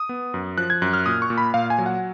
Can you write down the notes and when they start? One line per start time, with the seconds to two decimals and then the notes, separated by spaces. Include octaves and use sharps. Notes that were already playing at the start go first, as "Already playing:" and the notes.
Already playing: D#6
0.09 B3
0.34 F#2
0.58 F3 F#6
0.70 G#6
0.82 F#2 F#6
0.93 F6
1.06 A#2 D#6
1.22 C#6
1.30 A#2
1.38 B5
1.54 A#2 F5
1.70 G#5
1.78 F#3
1.86 F#5